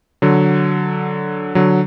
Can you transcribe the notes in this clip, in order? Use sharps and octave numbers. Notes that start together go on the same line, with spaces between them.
D3 F#3
D3 F#3